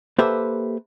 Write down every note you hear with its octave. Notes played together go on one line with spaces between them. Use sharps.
A#3 G4 A4 B4 C5 E5